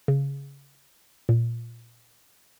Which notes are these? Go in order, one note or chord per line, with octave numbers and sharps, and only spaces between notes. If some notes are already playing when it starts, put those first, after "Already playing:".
C#3
A#2